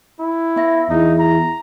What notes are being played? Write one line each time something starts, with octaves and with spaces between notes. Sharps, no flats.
E4
B3 E5 A#6
E2 D#4
A#5